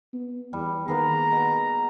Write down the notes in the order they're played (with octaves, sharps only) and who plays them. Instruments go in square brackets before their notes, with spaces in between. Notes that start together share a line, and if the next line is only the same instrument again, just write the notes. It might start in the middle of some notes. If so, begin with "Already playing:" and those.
[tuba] B3
[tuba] E2 [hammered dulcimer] G3
[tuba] D#3 [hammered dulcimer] A#3 B3 G#4 [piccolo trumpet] A#5
[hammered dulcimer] B2